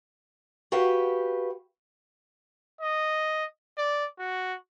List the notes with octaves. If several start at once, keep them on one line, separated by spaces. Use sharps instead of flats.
F#4 G4 B4 F5 G5
D#5
D5
F#4